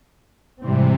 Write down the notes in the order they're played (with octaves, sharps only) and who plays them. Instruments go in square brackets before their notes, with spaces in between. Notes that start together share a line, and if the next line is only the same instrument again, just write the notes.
[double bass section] G#2 E3 G3 C4 [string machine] C3